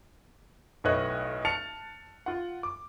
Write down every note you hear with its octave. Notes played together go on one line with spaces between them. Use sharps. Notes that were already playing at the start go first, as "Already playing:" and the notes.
B1 A2 B4 C#5 D#5 F#6
A5 F6 A6 C#7 F7
F4 F#5
D6